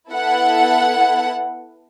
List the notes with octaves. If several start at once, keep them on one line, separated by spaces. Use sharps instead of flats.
B3 E4 A4 F#5